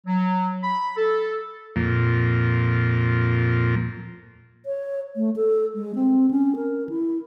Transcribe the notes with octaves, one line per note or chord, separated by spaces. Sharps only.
F#3
B5
A4
F2 A#2
C#5
A3
A4
G#3
C4
C#4
A#4
E4